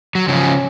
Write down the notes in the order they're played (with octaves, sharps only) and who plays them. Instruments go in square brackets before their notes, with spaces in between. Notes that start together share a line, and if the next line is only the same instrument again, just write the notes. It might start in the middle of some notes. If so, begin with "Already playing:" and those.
[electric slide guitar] F#3
[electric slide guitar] C#3 F3 [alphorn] C#4